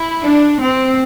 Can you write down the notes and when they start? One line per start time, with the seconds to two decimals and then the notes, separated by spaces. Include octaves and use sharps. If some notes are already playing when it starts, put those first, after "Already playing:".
Already playing: E4
0.24 D4
0.60 C4